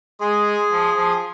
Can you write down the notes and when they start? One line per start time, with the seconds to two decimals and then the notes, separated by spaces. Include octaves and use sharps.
0.21 G#3 G#4
0.72 F3
0.96 F3